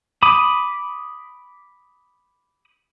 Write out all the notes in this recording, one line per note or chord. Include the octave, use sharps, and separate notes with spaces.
B5 D6 D#6